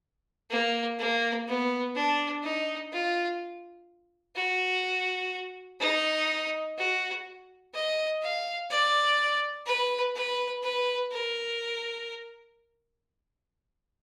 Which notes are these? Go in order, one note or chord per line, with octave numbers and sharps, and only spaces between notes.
A#3
A#3
B3
D4
D#4
F4
F#4
D#4
F#4
D#5
F5
D5
B4
B4
B4
A#4